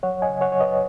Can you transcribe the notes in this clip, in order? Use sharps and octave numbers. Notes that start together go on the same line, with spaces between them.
F#3 C#5 F#5
D#5 G#5
C#3
C#5 F#5
F#3 C#5
B4 D#5